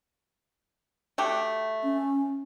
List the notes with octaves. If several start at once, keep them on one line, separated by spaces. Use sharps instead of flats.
A3 F#4 G4
C#4